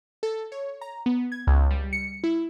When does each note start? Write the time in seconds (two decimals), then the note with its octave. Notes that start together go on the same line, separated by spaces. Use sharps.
0.23 A4
0.52 C#5
0.81 A#5
1.06 B3
1.32 G#6
1.47 C#2
1.71 G3
1.93 C#7
2.24 E4